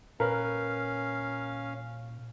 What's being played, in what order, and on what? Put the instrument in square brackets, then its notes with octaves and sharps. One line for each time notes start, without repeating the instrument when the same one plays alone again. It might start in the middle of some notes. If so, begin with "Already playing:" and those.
[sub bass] A#2 [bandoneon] C#4 F5 [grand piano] A#4 B4